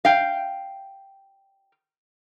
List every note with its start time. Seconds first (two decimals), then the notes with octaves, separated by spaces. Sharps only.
0.05 F5 G5